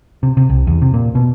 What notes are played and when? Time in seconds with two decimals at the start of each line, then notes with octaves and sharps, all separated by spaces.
0.23 C3
0.37 C3
0.49 C2
0.67 E2
0.82 C3
0.94 A#2
1.15 B2